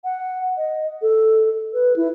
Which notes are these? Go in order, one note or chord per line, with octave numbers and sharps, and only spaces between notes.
F#5
D#5
A4
B4
E4